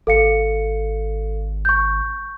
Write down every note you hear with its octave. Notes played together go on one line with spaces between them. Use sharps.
G#1 A4 F5 C#7
C#6 G6